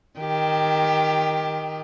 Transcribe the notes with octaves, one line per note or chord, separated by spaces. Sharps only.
D#3 G4